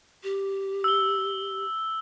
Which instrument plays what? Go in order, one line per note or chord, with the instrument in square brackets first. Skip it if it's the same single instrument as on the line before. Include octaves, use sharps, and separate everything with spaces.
[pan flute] G4
[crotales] E6 G7